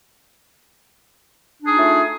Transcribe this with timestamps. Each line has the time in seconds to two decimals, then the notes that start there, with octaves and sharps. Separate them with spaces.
1.61 D4
1.66 G#4
1.70 D#4
1.74 F4
1.79 A3